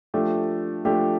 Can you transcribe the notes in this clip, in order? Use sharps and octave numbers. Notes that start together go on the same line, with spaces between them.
F3 A3 D4 G4
F3 A3 D4 G4